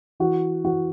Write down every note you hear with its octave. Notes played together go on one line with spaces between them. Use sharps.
E3 F#4
E3 F#4